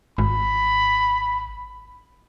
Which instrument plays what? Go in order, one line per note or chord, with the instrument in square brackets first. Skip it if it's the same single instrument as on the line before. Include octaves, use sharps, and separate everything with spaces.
[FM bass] G#1 [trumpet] B5